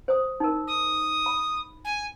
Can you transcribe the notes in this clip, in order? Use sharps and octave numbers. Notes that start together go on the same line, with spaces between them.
C5 D#6
D#4 A#4
D#6
B5
G#5